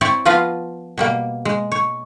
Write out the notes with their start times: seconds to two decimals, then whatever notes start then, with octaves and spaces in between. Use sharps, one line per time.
0.01 C4 E4 C#5 D5
0.25 F3 B3 F4 B4 F5 A#5
0.98 B2 G3 A#3
1.45 G#3
1.72 C#5